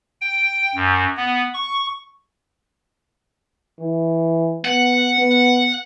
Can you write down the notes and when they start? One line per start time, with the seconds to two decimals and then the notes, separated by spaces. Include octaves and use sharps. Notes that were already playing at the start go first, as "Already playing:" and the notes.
0.21 G5
0.75 F#2
1.17 B3
1.54 C#6
3.79 E3
4.65 B3 F#5
5.18 B3